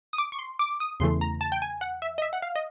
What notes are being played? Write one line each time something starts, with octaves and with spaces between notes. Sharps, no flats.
D#6
D6
C#6
C6
D6
D#6
E2 C#3 E3 A3 C6
A#5
A5
G5
G#5
F#5
E5
D#5
E5
F#5
F5
D#5